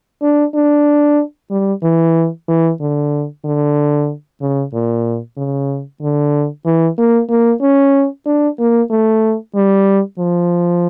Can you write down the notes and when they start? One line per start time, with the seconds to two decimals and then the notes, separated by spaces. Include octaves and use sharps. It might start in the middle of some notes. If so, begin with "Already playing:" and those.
0.22 D4
0.55 D4
1.51 G3
1.83 E3
2.48 E3
2.80 D3
3.45 D3
4.41 C#3
4.73 A#2
5.37 C#3
6.02 D3
6.66 E3
6.98 A#3
7.30 A#3
7.62 C#4
8.26 D4
8.59 A#3
8.90 A3
9.55 G3
10.19 F3